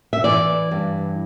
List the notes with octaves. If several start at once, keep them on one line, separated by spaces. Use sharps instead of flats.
E5
E3 D5
G2